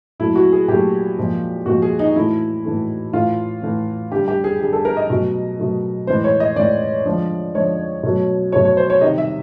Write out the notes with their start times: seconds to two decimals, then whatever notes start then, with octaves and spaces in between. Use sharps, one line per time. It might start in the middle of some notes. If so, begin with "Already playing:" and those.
0.19 A#2 F#3 A3 E4
0.36 F#4
0.52 G#4
0.68 A#2 F#3 A3 G4
1.18 A#2 F3 G#3
1.66 A#2 F3 G#3 F#4
1.82 G#4
1.99 D#4
2.16 A2 E3 A3 E4
2.65 A2 E3 A3
3.13 A2 E3 A3 F4
3.63 A2 E3 A3
4.12 D3 G3 G4
4.28 G4
4.44 G#4
4.60 D3 G3 G#4
4.73 A4
4.85 A#4
4.97 D#5
5.10 B2 F#3 A3
5.59 B2 F#3 A3
6.07 A2 E3 G#3 C5
6.24 C#5
6.40 D#5
6.56 A2 E3 G#3 D5
7.05 D3 F3 G#3
7.55 D3 F3 G#3 C#5
8.03 B2 F#3 A3
8.52 B2 F#3 A3 C#5
8.65 C#5
8.77 C5
8.90 C#5
9.01 C3 D#3 G3 D#5
9.18 E5